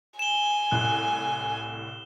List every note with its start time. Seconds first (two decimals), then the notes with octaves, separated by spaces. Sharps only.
0.19 G#5 E7 G7
0.71 C2 A2 F#6